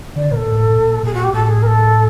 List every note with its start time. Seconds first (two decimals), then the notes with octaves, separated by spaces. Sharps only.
0.16 D3 D5
0.31 A#2 A#4
0.36 A4
0.46 A2
0.70 A2
0.74 A#2
1.03 A#2 G#4
1.13 F#4
1.23 G4
1.32 A2 A4
1.48 G#4
1.62 A#4
1.66 A4